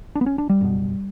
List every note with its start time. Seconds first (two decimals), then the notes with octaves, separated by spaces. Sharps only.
0.15 D4
0.21 B3
0.26 C#4
0.38 D4
0.49 G3
0.61 F#1 E2 B2